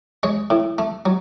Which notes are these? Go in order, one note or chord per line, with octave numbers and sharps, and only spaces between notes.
G#3 C#5
A2
A3
F#3